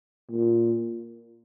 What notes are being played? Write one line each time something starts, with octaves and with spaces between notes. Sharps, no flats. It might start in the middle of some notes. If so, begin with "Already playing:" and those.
A#2